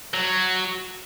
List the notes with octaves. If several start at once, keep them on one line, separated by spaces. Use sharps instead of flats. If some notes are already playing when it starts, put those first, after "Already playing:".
F#3